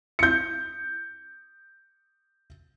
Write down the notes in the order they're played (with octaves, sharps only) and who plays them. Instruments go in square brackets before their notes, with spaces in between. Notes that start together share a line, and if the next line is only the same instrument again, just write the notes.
[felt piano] G6 C#7